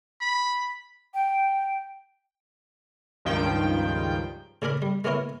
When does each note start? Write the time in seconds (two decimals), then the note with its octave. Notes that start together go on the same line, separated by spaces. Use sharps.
0.21 B5
1.14 G5
3.25 C#2 G2 D#3 F3 G5
4.62 C#3 D4 G#4 A#4 B5
4.82 G3
5.04 G#3 A#3 B3 C#4 E4 A#4